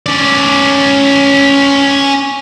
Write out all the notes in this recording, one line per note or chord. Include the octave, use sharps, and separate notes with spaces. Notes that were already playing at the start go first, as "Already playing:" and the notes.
C#4 D5